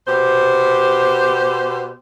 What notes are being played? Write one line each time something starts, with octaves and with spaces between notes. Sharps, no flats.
B2 G4 C5